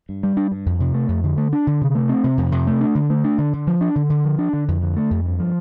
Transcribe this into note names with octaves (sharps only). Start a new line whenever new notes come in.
G2
G3
D4
G2
F2
C3
A3
F2
D3
A3
D4
D3
C3
A3
C4
C3
F2
C3
A3
D4
D3
A3
D4
D3
D3
F3
D4
D3
D3
F3
D4
D3
F2
D3
A3
F2
G2
F3